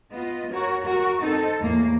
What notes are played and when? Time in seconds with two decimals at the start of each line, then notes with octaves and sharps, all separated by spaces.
0.11 B3 F4 D#5
0.52 F#4 A#4 C#5
0.85 F#4 A#4
1.22 C4 D#4 A4
1.60 E2 A2 A#3